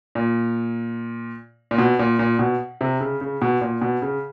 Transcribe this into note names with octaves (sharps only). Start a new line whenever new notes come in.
A#2
A#2
B2
A#2
A#2
B2
C3
C#3
C#3
B2
A#2
B2
C#3